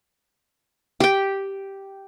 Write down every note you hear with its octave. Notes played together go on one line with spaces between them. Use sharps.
G4 G5